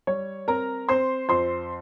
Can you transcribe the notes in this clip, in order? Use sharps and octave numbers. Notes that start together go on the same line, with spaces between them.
G3 C#5
C4 A#4 A#5
C4 C5 C6
F2 C5 C6